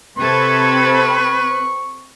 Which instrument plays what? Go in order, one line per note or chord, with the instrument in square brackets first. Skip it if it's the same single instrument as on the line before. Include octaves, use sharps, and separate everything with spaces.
[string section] C3 A4 G#6 [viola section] C4 B5 [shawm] B4 [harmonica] C#6